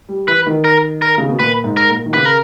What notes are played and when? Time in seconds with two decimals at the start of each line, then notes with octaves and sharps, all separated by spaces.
0.09 G3
0.28 E3 B4
0.46 D#3
0.64 A#4
1.02 A#4
1.18 C#3
1.29 B2
1.39 A#2 B4
1.64 G#2
1.77 A#4
1.90 A#2
2.06 D#3
2.14 C#3 B4
2.25 A#4